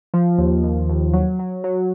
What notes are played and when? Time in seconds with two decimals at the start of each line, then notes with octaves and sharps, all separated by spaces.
0.14 F3
0.38 D#2
0.63 D#2
0.89 D#2
1.13 F#3
1.39 F#3
1.64 F#3